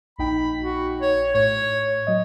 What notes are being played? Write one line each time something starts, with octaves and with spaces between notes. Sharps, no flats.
A#1 D#4 G5 B5
F#4
C#5
A2 C#5
F#3 D#5